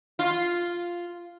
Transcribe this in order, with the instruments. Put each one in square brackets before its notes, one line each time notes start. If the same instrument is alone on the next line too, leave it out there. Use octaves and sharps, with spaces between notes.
[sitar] F4